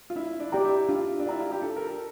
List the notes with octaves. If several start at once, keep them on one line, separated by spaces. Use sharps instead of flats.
F4
D4 E4
D4
G4 D5 G5 A#5
E4
D4 F4
D4
E4 G4 D5 G5 A#5
F4
G4
D4 A4
A#4
A4